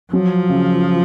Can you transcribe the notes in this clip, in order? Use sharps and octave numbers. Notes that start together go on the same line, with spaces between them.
F3 F#3
C#3